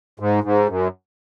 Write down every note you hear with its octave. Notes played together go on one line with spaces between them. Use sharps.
G#2
G#2
F#2